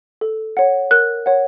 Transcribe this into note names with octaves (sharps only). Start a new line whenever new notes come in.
A4
C#5 F#5
A#4 F#6
C#5 F#5